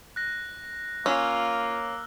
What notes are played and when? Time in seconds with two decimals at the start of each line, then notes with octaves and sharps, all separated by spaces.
0.16 F#6 A#6
1.06 A#3 C#4 F4 E6 F6